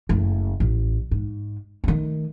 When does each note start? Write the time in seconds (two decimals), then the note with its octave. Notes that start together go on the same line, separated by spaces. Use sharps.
0.09 F#1 A3
0.60 A1
1.11 G#2
1.84 D#3 A3